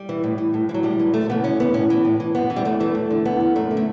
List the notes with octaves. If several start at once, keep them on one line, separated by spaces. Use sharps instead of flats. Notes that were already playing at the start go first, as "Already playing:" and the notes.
Already playing: G3
E3
A2
E3
A2
E3
F#3
A2 G3
E3
F#2 A3
C#3 E3 B3
F#2 C#4
C#3 E3 B3
A2 C#4
E3
A2
E3
F#2 B3
E3
G3
F#2 A3
E3 A3
E2
D3
E2 B3
D3
F#2 A3
D3
A3